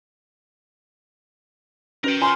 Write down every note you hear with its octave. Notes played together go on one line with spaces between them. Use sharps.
C#4 F#4 A#4 B4 G5
F4 G#5 C6 F6